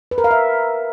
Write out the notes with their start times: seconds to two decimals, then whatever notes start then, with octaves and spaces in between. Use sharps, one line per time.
0.11 B4
0.18 A#4
0.24 F5
0.31 E5